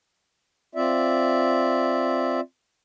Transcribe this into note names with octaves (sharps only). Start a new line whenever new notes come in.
C4 F4 D5 E5